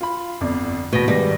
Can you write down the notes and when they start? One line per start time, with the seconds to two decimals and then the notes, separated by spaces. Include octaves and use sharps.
0.01 F4 B5
0.41 G1 F2 D5
0.93 E2 B2 A#6
1.08 G#2 D#3 G3 B3